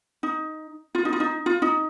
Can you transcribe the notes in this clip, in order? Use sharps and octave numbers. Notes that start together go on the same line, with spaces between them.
D#4
F4
D#4
F4
D#4
F4
D#4